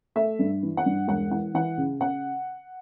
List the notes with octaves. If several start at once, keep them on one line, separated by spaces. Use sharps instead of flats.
A3 E5
G2
E3
F#5
G2
E1 F#5
E3 F#5
E3 F#5
C#3
C#3 F#5